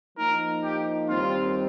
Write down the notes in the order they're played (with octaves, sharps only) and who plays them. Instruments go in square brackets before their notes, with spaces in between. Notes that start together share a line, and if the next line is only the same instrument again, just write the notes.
[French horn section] F3 A#3 D#4 [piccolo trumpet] A#4
[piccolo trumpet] G4
[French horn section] D#2 D#3 G3 C4 [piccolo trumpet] F4